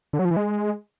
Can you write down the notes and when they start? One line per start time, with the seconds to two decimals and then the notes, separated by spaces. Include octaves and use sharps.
0.13 D3
0.19 F#3
0.25 F3
0.31 E3
0.37 G#3